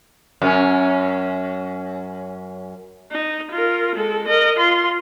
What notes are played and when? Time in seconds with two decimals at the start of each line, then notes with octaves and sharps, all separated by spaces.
0.42 F#2 C#4
3.11 D#4
3.51 F4 A#4
3.95 G#3 A4
4.27 A#4 D#5
4.58 F4 C6